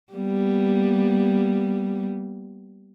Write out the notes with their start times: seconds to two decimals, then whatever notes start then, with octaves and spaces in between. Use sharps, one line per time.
0.13 G3 A#3 B3